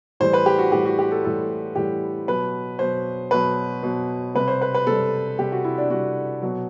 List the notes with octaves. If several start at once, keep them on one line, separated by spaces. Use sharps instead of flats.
A2 E3 G3 C5
B4
G4
F#4
A2 E3 G3 G4
F#4
G4
A4
A2 E3 G3 A4
A2 E3 G3 G4
B2 F#3 B4
B2 F#3 C5
B2 F#3 B4
B2 F#3
C3 G3 B4
C5
B4
B4
C3 G3 A4
C3 G3 G4
F#4
E4
D4
C3 G3 F#4
B2 F#3